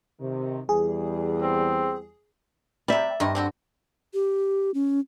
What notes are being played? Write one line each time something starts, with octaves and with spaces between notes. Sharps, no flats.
C3 D#3
E2 G3 G#4
C4
C3 G3 D5 E5
G2 D#3 C4 D#5
D3 C4 F#4
G4
C#4